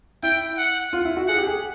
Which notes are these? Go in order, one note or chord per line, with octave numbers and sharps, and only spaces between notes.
E4 G5
F#5
F4
E4
F#4
G#4 F#5
G4
G#4